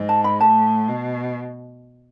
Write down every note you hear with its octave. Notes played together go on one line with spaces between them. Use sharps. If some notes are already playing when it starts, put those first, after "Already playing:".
Already playing: G#2
A5
B5
A2 A5
B2